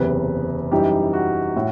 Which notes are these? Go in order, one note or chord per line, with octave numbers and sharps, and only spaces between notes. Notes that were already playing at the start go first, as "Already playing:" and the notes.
Already playing: F#1 E2 C3 B4
F#2 E3 G3 D#4 G4
F#4
A2